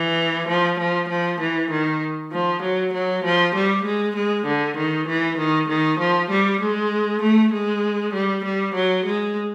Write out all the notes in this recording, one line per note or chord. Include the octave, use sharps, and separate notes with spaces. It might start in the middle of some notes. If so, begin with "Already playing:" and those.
Already playing: E3
F3
F3
F3
E3
D#3
F3
F#3
F#3
F3
G3
G#3
G#3
D3
D#3
E3
D#3
D#3
F3
G3
G#3
A3
G#3
G3
G3
F#3
G#3